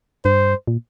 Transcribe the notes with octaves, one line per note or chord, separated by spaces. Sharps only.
G2 C5
A#2